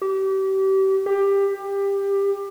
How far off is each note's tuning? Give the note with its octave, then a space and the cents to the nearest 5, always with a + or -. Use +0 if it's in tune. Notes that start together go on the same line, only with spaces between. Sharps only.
G4 -30
G4 +20